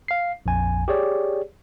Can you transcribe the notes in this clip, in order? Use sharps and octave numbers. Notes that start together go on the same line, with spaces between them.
F5 C7
A#1 F2 G#5
G4 G#4 C#5 D5